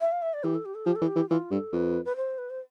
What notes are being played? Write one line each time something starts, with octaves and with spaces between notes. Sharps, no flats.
E5
F5
E5
D5
E3 G4
A4
G4
A4
F3 G4
A4
E3
G4
E3
E3 F4
G2 A4
F2 B4
B4
C5
B4
C5